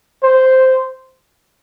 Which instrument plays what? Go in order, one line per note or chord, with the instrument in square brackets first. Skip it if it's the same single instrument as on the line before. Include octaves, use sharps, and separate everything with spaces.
[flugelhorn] C5